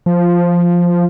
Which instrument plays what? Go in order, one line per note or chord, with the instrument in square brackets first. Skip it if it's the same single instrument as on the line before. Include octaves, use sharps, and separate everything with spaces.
[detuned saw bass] F3